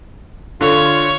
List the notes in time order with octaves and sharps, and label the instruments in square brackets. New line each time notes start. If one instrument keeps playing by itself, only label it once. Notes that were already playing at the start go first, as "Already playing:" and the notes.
[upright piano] D3 [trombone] F4 [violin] C#5